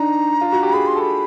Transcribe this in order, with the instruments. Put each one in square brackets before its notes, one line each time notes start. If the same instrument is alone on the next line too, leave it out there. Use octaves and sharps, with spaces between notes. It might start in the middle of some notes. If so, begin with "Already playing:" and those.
Already playing: [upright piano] D4 D#4 [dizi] A#5
[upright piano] F4
F#4
G4
[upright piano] G#4 [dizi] B5
[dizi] C6
[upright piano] A4 [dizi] B5